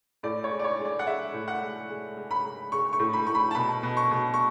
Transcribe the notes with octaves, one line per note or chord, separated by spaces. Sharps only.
A2 D5
C#5
G#3
D5
C#5
G#3
D5
F#5
G#3 E5
A2
F#5
G#3
G#3
G#3
B5
G#3
G#3 C#6
C#6
A2
B5
A2 C#6
B5
A5
B2 B5
B2
C#6
B2
C#6